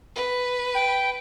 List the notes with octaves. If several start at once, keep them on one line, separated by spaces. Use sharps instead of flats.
B4
G5